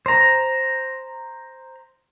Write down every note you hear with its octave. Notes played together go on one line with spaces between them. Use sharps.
C5 A#5